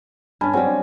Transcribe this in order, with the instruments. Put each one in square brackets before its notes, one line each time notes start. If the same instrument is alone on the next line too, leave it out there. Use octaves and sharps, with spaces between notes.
[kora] G2 C#4 [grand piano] G#5 A5 B5
[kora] F#3 G3 [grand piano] C4 G#5